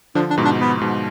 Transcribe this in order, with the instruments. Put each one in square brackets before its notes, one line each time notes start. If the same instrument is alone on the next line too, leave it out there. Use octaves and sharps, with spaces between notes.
[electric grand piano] D3 F3 [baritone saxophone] D4
[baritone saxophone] D4
[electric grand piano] G#2 B2
[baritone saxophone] D4
B3
[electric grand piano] G#2 B2